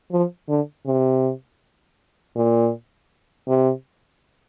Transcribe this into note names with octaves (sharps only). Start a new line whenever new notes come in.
F3
D3
C3
A#2
C3